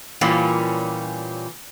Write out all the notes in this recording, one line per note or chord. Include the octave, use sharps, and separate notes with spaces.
A#2 E3 G3 A#3 C#4 F4